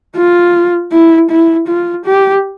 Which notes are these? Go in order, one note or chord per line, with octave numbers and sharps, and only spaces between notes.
F4
E4
E4
F4
G4